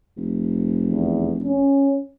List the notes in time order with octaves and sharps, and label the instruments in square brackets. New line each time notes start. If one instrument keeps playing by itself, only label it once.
[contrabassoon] F1
[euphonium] E2
C#4